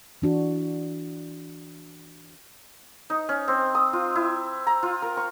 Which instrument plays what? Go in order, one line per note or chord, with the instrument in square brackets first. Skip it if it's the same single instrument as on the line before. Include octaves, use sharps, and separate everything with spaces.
[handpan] E3 D4 F#4
[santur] D#4
C#4
C4
D#6
F4
E4
A#5
F4
A#4
C#6